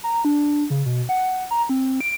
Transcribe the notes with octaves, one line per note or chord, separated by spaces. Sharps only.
A#5
D4
C#3
B2
F#5
A#5
C4
D7